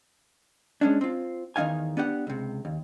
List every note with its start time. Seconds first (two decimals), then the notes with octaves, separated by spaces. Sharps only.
0.81 G#3 C#4 D4
1.01 C4 F4
1.56 E2 D#3 B3 D#4 F5 G#5
1.97 B3 D4 G4 F#5
2.27 C#2 C3
2.65 D#2